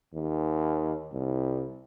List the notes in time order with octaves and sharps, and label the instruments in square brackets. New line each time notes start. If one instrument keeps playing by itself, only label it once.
[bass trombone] D#2
C2